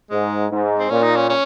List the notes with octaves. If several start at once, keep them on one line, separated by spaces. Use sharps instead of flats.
G#2 G#3
G#2
C4
A#2 C#4
D#4
C#4
C#4